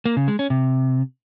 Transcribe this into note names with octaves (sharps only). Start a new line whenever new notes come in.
A#3
C#3
G#3
C#4
C3